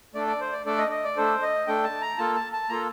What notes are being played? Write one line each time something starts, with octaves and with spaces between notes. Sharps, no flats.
A3 D4 A4 D5
D5
C5
D5
A3 D4 A4 D5
D#5
D#5
D5
A3 D4 A4 C5
D#5
A3 D4 A4 G5
A5
A#5
A#3 F4 A4 A5
A5
A5
A#3 F4 A4 A#5